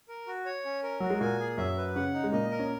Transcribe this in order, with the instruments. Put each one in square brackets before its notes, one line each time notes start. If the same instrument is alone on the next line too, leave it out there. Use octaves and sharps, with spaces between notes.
[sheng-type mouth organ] A#4
F#4
C#5
C#4
A#4
[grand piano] F#3 [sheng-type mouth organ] F#4
[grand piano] G#3
[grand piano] A#2 A#3 [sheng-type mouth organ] G#5
[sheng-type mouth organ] G#4
[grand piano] F#2 F#3 [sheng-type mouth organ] E5
[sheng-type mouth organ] B4
[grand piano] C#3 C#4 [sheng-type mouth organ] F#5
[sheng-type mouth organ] D#4
[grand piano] G#3
[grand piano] A#2 A#3 [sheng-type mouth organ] D#5
[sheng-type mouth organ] A#4
[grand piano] C#4